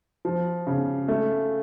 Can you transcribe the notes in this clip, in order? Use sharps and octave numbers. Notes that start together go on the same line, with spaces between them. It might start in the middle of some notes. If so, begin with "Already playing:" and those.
F3
C#3
A3